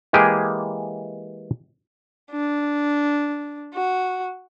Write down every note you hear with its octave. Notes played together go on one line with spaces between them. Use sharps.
E3 G#3 A#3 G4 G#4
D4
F#4